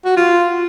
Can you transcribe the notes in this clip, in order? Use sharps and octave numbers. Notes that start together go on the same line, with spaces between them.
F#4
F4